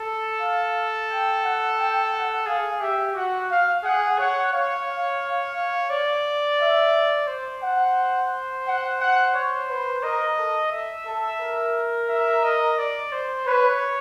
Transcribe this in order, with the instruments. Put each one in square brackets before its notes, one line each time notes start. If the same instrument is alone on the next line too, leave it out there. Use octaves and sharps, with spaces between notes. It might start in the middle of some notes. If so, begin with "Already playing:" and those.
Already playing: [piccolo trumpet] A4
[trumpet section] F5
G5
F#5
G5
F#5
[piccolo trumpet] G#4 [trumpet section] F5
[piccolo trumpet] G4 [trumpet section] E5
[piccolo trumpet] F#4 [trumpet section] F#5
[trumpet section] F5
[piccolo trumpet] G#4 [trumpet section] F#5
[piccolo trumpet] C#5 [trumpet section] F#5
[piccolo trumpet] C#5 [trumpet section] F5
[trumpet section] F5
[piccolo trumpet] D5
[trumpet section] E5
[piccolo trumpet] C5
[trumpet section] F#5
F#5
F#5
C#5
B4
[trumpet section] A#4 [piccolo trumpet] D#5
[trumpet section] A4
[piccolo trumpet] E5
[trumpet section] A4
A#4
[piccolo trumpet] E5
D#5
D5
C5
[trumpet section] B4 [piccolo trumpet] C#5